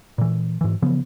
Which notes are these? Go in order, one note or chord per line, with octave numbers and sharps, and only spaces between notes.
A#2 E3
G#2 E3
C#3 E3 F3 B3